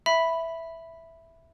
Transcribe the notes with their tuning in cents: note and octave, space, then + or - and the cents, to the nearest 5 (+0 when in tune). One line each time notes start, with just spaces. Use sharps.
E5 +0 B5 +0